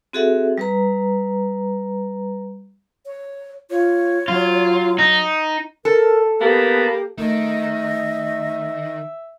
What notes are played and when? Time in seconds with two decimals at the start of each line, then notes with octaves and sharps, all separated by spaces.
0.13 C4 F#4 G#4 A4 E5 F#5
0.58 G3 B4 A#5
3.06 C#5
3.70 F4 C#5
4.28 F#3 F4
4.99 D#4
5.85 A4 A#4
6.40 A#3 B3 G4 B4 A5
7.18 D#3 A3 D#5 E5